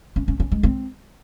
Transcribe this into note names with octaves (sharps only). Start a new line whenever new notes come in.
C#4
C#4
C#4
G#3
C4